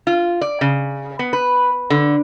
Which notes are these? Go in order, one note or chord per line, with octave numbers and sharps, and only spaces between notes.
F4
D5
C#3
B3
B4
D3